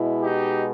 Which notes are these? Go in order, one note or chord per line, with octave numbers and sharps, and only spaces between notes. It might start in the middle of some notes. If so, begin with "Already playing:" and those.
Already playing: B2 G#3 E4
D#4 G4